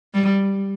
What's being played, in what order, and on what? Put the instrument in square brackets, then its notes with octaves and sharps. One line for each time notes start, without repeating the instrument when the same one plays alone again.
[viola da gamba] G3